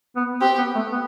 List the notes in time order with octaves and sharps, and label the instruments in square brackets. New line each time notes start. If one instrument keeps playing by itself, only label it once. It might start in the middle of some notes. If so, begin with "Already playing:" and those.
[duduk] B3
[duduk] C4 [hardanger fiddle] G4
[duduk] B3
A3
B3